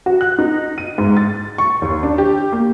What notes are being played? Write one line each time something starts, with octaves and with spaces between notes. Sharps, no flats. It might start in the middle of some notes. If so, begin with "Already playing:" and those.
F#4
F#6
D#4
D#7
G#2
A6
C#6
D#2
D4
G4
A#3